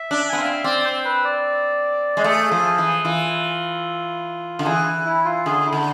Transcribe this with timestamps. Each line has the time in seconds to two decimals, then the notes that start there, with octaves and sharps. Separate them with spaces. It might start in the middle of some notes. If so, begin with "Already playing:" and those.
Already playing: E5
0.11 D4
0.29 B3 G#5
0.38 C4 F5
0.53 E5
0.64 C4 D5
0.85 C5
1.05 B4
1.25 D5
2.17 G#3
2.24 A3 G#4
2.51 F3
2.78 E3
3.04 E3 F4
4.59 D3
4.66 E3 G#4
5.06 E4
5.25 F4
5.46 D3 G#4
5.66 E4
5.73 D3